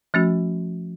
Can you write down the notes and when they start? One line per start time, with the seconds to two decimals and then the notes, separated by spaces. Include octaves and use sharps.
0.14 F3 A3 C#4 F#4